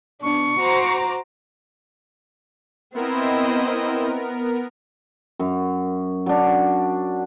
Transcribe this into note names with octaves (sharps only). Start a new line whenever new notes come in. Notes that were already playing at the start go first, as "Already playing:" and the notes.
B2 D4 C#6
F#4 C5 A#5 D6
B3 C4 E4 A#4 D#5
F#2
F#3 D4